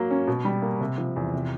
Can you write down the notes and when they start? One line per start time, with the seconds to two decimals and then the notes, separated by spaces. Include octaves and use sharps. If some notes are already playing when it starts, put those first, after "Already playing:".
Already playing: F#3 A#3
0.11 C#4
0.27 B2
0.45 G3
0.62 A#3
0.81 C3
0.98 F3
1.16 E2
1.33 C3